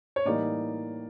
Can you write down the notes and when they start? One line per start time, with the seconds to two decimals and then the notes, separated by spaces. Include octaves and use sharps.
0.16 C#5
0.25 A2 E3 G3 A#3 D#4 D5